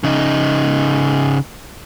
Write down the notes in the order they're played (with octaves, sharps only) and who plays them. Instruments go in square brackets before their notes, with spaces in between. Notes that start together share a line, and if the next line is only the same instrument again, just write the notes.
[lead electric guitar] C#3 D#4